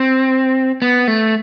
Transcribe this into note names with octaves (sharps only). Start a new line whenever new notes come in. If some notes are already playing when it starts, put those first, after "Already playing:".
Already playing: C4
B3
A3